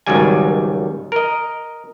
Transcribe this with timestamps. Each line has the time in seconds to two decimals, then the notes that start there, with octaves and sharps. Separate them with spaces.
0.06 G#1 C#2 D#3 F#3 G3 G#5
1.12 A#4 D#5